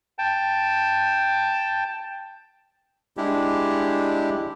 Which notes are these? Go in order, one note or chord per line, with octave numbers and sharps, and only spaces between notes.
G5 A5
G#3 D4 E4 G4